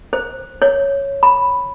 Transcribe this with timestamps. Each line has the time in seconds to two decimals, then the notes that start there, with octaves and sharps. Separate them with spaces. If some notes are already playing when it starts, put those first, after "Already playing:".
0.13 C5
0.62 C#5
1.23 B5